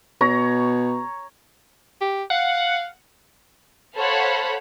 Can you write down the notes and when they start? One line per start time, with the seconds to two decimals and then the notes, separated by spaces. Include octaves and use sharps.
0.21 B2 C#5 A#5
2.01 G4
2.30 F5 F#5
3.95 A4 C5 C#5 F5 F#5 B5